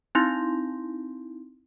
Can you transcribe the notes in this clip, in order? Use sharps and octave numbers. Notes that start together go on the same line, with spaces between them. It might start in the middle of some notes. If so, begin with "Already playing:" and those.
C4 D#4 E4 C6 G6 A#6